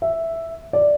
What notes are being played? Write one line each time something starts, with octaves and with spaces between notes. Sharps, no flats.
E5
D5